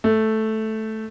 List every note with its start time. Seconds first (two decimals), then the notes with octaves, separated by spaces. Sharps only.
0.04 A3